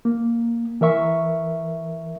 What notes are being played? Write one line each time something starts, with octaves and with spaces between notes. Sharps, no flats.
A#3
E3 A#4 E5 C#6